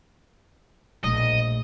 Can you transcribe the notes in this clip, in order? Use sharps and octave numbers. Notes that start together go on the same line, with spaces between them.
A#1 A3 D#5